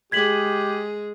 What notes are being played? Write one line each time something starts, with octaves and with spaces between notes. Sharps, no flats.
G#3 G4 G#4 G#6 B6 F#7